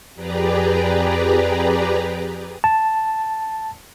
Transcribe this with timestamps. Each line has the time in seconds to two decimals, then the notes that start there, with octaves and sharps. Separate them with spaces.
0.14 F2 G4 G#4 B4 D5 A#5
2.64 A5